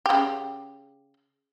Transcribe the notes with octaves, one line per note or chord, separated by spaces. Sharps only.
C#3 G4